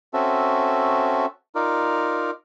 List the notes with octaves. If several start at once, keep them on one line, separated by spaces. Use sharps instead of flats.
C4 C#4 F#4 A4 E5
D#4 F4 A#4 D5